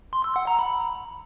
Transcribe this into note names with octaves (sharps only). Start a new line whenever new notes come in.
C6
E6
F#5
A#5
B5